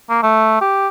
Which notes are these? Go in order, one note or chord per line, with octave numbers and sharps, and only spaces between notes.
A#3
A3
G4